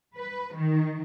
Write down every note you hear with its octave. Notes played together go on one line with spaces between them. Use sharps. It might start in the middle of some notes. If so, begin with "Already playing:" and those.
B4
D#3